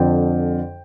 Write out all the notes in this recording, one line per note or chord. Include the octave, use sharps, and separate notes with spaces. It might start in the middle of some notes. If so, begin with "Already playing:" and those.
Already playing: F2 D3 G5